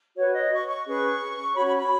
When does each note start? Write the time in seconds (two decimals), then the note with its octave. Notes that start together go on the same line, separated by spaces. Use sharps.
0.16 F#4 B4 C#5
0.34 D#5
0.51 C#6
0.69 C#6
0.86 C#4 G#4 B4 C#6
1.54 C#4 F#4 C#5 B5
1.66 B5
1.77 B5